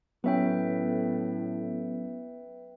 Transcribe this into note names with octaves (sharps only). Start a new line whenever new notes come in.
A2 F#3 B3 C#4 B4 E5 G5